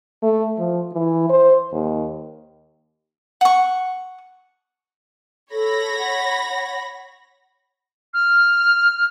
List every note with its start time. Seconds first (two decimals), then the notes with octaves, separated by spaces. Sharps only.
0.22 A3
0.58 F3
0.93 E3
1.30 C5
1.72 D#2
3.41 F#5 C#6
5.52 A4 C#5 B5 A#6
5.99 F#5
8.13 F6